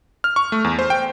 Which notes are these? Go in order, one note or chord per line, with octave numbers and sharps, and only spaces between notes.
F6
C#6
A3
E2
C5
G5